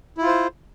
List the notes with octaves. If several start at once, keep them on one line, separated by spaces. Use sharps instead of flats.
E4 F4 C5